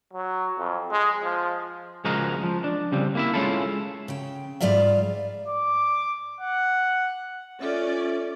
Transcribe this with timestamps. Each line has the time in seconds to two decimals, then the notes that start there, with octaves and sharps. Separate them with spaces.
0.13 F#3
0.59 F2
0.91 G#3
1.24 F3
2.05 C#2 F3 G#3 F#4 A#4 D#5
2.44 F3
2.64 D4
2.92 C#3 G3 C4
3.15 A#3 E4 E5
3.33 G#3 C#4 E4 F4 A4
4.08 C#3 G5
4.61 G#2 G3 F4 D5 E5 F5
5.48 D6
6.41 F#5
7.61 C#4 F4 A4 D5 E5